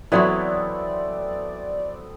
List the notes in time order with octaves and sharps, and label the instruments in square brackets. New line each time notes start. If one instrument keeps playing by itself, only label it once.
[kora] E3 F#3 F#4 [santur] A3 B3 C4 [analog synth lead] D5